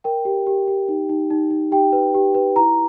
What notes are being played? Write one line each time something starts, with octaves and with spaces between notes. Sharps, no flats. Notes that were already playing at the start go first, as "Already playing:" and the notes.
A#4 G5
G4
G4
G4
D#4
D#4
D#4
D#4
G4 G5
B4
G4
B4
E4 A#5